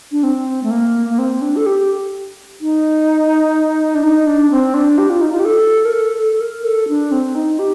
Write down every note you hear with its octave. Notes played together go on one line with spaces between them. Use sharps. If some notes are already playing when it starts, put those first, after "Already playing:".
D4
C4
A3
A#3
A#3
C4
D4
A4
G4
D#4
D4
D#4
D4
C4
D4
G4
F4
D#4
F4
G4
A4
A#4
A4
A4
A#4
A4
D4
C4
D#4
G4